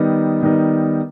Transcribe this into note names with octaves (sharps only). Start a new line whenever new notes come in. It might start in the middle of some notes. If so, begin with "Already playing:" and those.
Already playing: D#3 G3 B3 D#4
D#3 G3 B3 D#4